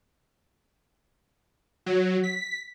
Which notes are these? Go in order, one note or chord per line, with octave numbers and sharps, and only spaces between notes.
F#3
B6